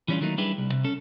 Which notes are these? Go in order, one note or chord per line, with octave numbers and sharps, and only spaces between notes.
E3 G3 C#4 D4 F4
D#3 F#3 A3 A#3 D#4
G3 D4 E4 G4 G#4 B4
C2
C3
C#4 A4